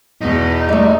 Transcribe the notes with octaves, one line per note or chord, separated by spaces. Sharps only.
E2 B2 D#4
G3 A3